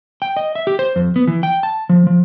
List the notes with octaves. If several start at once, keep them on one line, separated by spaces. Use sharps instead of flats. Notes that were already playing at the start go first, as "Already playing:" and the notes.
G5
D#5
E5
G4
C5
F2
B3
E3
G5
A5
F3
F3